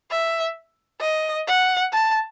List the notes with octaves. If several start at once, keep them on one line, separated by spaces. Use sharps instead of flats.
E5
D#5
F#5
A5